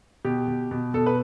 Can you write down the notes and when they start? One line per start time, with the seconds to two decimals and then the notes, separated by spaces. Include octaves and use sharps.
0.25 B2 G4
0.48 B2
0.71 B2
0.94 B2 A4
1.06 B4